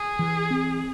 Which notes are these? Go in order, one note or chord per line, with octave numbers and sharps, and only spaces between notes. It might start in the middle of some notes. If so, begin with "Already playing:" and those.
Already playing: G#4
E3
C4